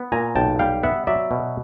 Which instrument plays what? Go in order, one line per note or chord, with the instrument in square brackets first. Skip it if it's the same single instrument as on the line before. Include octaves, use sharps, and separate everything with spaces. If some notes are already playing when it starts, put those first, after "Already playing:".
Already playing: [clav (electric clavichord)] B3
A#2 G#5 A#5
B1 G5 A5
G3 F5 G5
B3 E5 F#5
F#3 D5 E5
B2